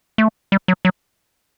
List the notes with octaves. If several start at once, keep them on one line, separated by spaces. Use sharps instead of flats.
A3
G3
F#3
F#3